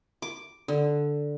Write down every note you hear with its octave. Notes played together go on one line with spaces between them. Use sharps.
D6
D3